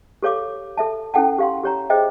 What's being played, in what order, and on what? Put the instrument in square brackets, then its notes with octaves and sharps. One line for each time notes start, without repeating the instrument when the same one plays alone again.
[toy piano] G4 A4 C#5 F5 D6
A4 E5 A5
C#4 E4 A4 F#5 G5 A5
G4 F5 C6
G4 C#5 A#5
G#4 C5 D#5 E5 G5